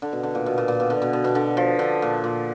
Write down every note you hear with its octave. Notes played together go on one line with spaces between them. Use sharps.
D3
B2
D3
A#2
B2
A#2
A#2
B2
D3
B2
B2
B2
D3
F3
D3
A#2
A#2